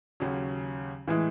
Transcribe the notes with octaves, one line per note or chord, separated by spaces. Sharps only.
D#2 C#3 F#3 C#4
A2 E3 G#3